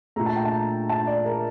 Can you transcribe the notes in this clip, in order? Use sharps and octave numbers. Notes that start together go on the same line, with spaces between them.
A#2 A3 A#5
A5
G5
A5
A5
D5
A#4